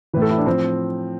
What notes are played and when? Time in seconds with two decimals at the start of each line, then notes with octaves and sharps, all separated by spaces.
0.14 A2 E3 B4
0.22 A4
0.31 E4
0.38 D4
0.46 A2 F3 C4